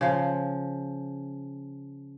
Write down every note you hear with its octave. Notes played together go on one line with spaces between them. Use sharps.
C#3 F3